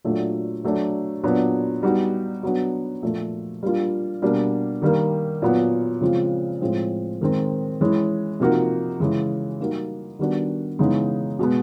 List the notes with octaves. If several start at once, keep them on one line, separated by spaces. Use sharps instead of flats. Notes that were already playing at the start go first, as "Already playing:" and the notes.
A#2 F#3 A3 D4 F#4
F#3 A3 D4
A#2 F#3 B3 D4 F#4
G3 B3 D#4 F#4
F#3 B3 D4 F#4
A#2 F3 A3
G3 A#3 D4 F4
B2 G3 A#3 D4
D#3 G3 A#3
A#2 F#3 B3
C#3 F3 G#3 C4 F4
A2 F3 G#3 C4
D#3 G#3 C4
E3 G#3 C#4 E4
C3 F3 A#3 D#4 F#4
C#3 E3 G#3
G3 A#3 D#4 F#4
D#3 G3 B3 D4 F#4
C#3 E3 G#3 B3 D#4
B2 G#3 B3